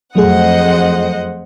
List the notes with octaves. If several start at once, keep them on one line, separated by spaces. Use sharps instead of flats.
F2 F#3 A3 G#4 C5 D#5 F#5